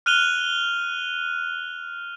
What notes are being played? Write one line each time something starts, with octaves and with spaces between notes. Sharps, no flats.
F6 F#6 D#7 F7 G7